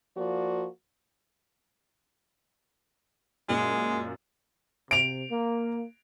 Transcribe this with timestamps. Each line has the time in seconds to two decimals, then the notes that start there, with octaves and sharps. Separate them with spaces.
0.17 F3 A#3 F#4 D5
3.49 F#2 A#2 G#3
4.91 C3 D7 F7
5.31 A#3